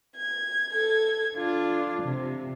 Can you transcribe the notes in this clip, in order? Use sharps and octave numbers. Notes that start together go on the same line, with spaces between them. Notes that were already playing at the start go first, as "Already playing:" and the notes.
G#6
A4 G#6
D4 F4
C3